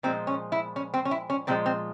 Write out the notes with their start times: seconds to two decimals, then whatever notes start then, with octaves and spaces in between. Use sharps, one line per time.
0.03 A#2 F3 G#3 C4
0.27 C#4
0.52 E4
0.76 C#4
0.94 C4
1.05 C#4
1.11 E4
1.30 C#4
1.47 A#2 F3 G#3 C4
1.66 C4